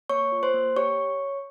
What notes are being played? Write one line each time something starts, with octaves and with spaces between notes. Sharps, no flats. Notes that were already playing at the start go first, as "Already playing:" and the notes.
A#3 C#5 C#6
F4
C5 C6
A#3
G4 C#5 C#6